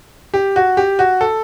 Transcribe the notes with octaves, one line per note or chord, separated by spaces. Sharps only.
G4
F#4
G4
F#4
A4